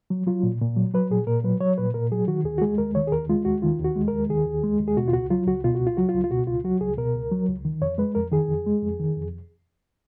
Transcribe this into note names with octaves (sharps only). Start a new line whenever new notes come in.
F#3
F#3 F4
A#2
A#2
F#3
F#3 B4
A#2 G#4
A#2 A#4
F#3 B4
F#3 C#5
A#2 B4
A#2 A#4
F#3 G#4
D#3 F#4
D#2 G#4
F#4
G#3 G#4
D#2 A#4
D#3 C#5
G#4
D#2 A#4
G#3 F4
D#2 F#4
D#3 F4
D#2
F#4
G#3
A#4
D#2
D#3 G#4
D#2
G#3
D#2
G#4
B2 F#4
F4
C#2 F#4
F#3 F4
C#2 F#4
B2 F4
F#4
C#2
F4
F#3 F#4
F4
C#2
F4
B2 F#4
C#2 F4
F#3 F#4
C#2 G#4
B2 A#4
C#2
F#3
C#2
D#3
F2 C#5
G#3 B4
F2 A#4
D#3 G#4
F2
G#3
F2
D#3
F2